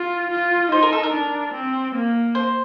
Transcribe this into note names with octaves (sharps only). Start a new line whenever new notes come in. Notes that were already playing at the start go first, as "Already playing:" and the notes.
Already playing: F4
F4
D#4 C5
A#4
A4
A#4
D4
C4
A#3
C5